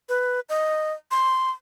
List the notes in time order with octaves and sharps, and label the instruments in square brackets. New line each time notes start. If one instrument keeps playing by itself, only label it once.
[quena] B4
D#5
C6